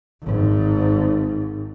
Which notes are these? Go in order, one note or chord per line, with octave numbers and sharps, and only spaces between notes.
G#1 G#2